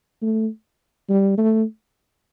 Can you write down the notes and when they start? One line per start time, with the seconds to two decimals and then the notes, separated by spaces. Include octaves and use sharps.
0.22 A3
1.09 G3
1.38 A3